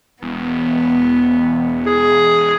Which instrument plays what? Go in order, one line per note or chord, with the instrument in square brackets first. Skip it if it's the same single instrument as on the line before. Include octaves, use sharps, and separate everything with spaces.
[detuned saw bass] E1 [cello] B3
[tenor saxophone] G#4